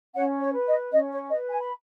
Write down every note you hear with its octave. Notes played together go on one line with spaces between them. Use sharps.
C#4 C#5 F#5
C#5
B4
D#5
C#4 D#5
C#5
B4 D#5
G#5
B5